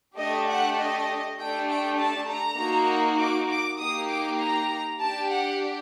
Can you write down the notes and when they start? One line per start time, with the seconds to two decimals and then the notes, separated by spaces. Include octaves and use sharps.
0.17 A3 D4 G4 D#5
0.47 F#5
0.78 D#5
1.38 A3 D4 G4 G5
1.68 G5
1.98 A5
2.28 A#5
2.59 A#3 D#4 F#4
3.19 D6
3.49 D6
3.79 A#3 D#4 G4 D#6
4.09 D6
4.39 A#5
5.00 D4 G4 A5
5.30 F#5